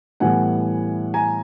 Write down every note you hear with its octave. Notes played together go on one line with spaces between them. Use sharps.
A2 E3 G3 B3 F#5 G#5
G#5 A#5